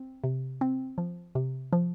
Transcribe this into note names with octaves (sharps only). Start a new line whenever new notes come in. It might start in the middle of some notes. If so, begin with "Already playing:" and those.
Already playing: C4
C3
C4
F3
C3
F3